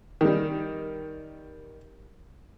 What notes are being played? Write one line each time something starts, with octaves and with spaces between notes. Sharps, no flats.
D#3 G3